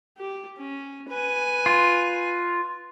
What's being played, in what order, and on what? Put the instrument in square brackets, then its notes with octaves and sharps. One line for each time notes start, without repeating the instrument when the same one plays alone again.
[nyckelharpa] G4
C#4
B4 G#5
[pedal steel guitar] F4